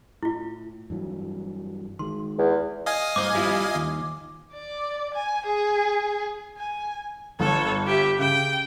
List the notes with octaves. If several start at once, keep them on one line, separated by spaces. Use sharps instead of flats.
A2 E4 F4
G2 E3 F#3
D#3 G#3 C6
E2
D#5 F5 G#5
G2 C5 D6
G3 E4 F4
D#2
D5
G#5
G#4
G#5
G1 A4 C#5
G4 E5
C#3 G5